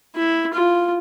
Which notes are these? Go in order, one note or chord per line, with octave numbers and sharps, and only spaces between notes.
E4
F4